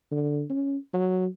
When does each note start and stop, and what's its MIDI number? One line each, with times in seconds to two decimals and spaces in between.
0.11 0.43 50
0.50 0.77 61
0.94 1.26 54